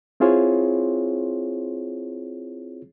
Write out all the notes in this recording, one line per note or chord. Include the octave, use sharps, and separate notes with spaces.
C4 E4 F4 G#4 C5 C#5